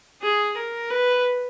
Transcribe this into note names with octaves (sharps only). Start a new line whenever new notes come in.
G#4
A#4
B4